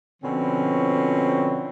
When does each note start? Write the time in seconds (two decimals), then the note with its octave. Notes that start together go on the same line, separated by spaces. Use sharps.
0.23 B2 D3 F3 C4 C#4